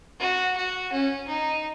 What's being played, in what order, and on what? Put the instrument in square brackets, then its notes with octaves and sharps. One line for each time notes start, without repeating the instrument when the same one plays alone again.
[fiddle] F#4
F#4
C#4
D#4